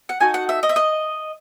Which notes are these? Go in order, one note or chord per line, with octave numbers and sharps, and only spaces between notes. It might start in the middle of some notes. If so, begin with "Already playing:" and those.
F#5
D#4 F#4 A4 G#5
F#5
E5
D#5
E5
D#5